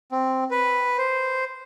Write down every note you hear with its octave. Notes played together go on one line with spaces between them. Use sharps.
C4
B4
C5